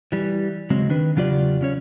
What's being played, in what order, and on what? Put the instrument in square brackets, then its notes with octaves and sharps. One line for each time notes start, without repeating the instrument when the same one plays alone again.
[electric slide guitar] E3 G3
C#3 F#3 G#3 C4
D#3 D4 B4
E2 C#3 F#3 F4 G4 D5
C#3 C#4 C#5